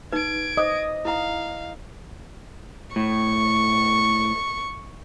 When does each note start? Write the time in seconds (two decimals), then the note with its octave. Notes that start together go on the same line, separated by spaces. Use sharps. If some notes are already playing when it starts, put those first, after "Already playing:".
0.12 D#4 B4 G#6 D7
0.57 C5 D#5 D6 D#6
1.05 E4 F5 A#5
2.96 A2 C#6